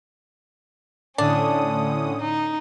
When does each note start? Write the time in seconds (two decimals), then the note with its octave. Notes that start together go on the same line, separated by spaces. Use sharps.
1.18 A2 D3 C#4 D4 D#6
2.21 D#4